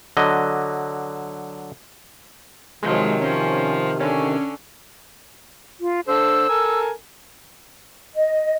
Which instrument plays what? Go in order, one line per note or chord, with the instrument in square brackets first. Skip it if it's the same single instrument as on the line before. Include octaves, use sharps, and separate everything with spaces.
[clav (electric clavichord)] D3 F#3 D#5
[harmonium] C3 D#3 [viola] F3 F#3 [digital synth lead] G#3
[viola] F3 [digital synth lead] C#4
[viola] D3 [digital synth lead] C#4
[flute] F4
[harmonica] D3 A4 C5 [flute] E6
[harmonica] A4 A#4 G#5
[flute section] D#5